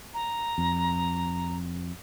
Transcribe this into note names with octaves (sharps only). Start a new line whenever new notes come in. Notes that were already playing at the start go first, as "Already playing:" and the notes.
A#5
F2